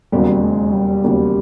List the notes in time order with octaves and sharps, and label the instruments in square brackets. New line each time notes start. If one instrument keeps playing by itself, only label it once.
[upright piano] E1 D#2 C#3 F#3 A#3 [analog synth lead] G3
[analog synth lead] G#3
G3
[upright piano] E1 D#2 C#3 F#3 A#3